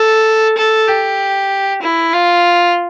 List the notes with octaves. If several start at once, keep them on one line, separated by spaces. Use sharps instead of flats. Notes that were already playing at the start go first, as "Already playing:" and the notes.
Already playing: A4
A4
G4
E4
F4